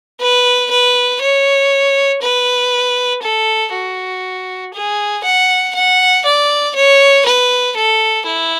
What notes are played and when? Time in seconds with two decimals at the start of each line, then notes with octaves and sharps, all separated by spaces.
0.21 B4
0.71 B4
1.21 C#5
2.22 B4
3.23 A4
3.74 F#4
4.74 G#4
5.25 F#5
5.75 F#5
6.25 D5
6.76 C#5
7.26 B4
7.77 A4
8.27 E4